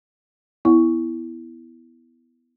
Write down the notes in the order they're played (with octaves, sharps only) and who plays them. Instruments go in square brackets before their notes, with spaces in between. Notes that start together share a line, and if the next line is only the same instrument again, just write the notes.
[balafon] B3 E4